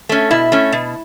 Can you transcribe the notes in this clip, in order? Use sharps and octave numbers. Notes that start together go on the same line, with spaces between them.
A3 C#4
B2 E4
A3 C#4
B2